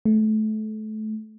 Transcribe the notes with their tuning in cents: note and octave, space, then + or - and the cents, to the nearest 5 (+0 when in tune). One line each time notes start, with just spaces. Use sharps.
A3 -25